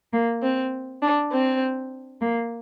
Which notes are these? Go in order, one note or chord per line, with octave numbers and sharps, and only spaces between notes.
A#3
C4
D4
C4
A#3